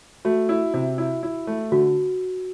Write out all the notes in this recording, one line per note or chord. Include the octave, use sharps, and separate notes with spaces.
A3 F#4
E4
C3
E4
E4
A3
D3 F#4